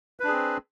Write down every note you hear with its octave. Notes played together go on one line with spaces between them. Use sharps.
C4 D4 G#4 B4